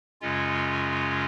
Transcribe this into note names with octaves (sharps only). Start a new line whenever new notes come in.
F#2 C#3 G#3 C#4 F4